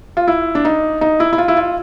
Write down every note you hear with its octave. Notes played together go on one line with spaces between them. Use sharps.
F4
E4
D4
D#4
D#4
E4
E4
F4
E4
F4